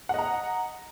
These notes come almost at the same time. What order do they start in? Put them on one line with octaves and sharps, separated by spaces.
F#5 D#5 A#5